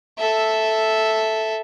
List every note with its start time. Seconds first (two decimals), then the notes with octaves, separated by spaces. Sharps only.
0.18 A4 E5